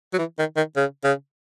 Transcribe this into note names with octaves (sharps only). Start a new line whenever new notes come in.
F#3
E3
D#3
D#3
C#3
C#3